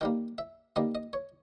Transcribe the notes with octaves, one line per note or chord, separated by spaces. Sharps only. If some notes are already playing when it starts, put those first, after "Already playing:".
D#3 G3 A#3 G5
E5
D#3 G3 A#3 D#5
D#5
C#5